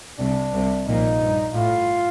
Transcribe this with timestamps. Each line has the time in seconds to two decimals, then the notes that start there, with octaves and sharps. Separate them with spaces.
0.19 C2 C3 D4
0.53 C2 C3
0.86 A#1 A#2 D#4
1.21 G2
1.53 A2 F4